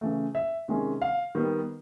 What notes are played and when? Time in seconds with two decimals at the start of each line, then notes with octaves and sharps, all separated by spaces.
0.01 C#3 E3 A3
0.35 E5
0.68 C3 D#3 G#3 C#4
1.02 F5
1.35 D#3 G3 B3